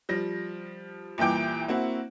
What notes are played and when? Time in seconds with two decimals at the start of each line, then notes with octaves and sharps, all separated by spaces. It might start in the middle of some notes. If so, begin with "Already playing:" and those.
0.09 F3 G3 A#6
1.18 C2 A#2 E3 G5 D6
1.68 A#3 C4 E4 F#4 F#5